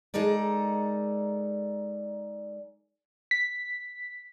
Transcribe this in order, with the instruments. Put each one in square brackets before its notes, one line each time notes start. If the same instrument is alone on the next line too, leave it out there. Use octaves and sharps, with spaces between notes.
[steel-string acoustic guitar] G#3 D#4 A4 A#4 D5
[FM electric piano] B6